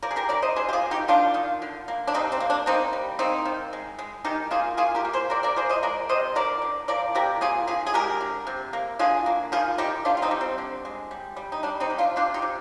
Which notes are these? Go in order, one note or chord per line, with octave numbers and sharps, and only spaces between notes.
F3 A#4 D5
G#4
G4 A#4
D3 A#4 D5
C5 D#5
C3 G#4 C5
G4
F4 G#4
A#3
D#4 G4
D#3 D4 F4
D#3
D3
A#3
D4
C3 C4 D#4
C4
A#3
D4
A#3 C4 D#4
G3
A#3 C4 D#4
D#3
G#3
G#3
D#3 D#4 G4
A#3 F4 G#4
A#3 F4 G#4
G4 A#4
A#3
G#4 C5
C3 A#4 D5
A#4 D5
F3 G#4 C5
C5 D#5
G#3 A#4 D5
C3 C5 D#5
D3 A#4 D5
D3
F3 A#4 D5
C3 G4 A#4
A#3 F4 G#4
D3 F4 G#4
G#4
G#3 G4 A#4
D3
C3
A#3
D3 F4 G#4
A#3
D#3 F4 G#4
D#3 D#4 G4
G3 D4 F4
F4
C4 D#4
G3
C4
D3
G#3
G3
G3
D#4
G3 D4
C4 D#4
D3
D4 F4
C3 D4 F4
D#4 G4
C3